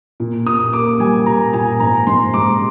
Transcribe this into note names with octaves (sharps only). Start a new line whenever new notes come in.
A#2
A#2 D#6
A#3 D6
G3 G#5
A#2 A#5
A#2 G#5
G#2 A#5
G#2 C6
G#3 D6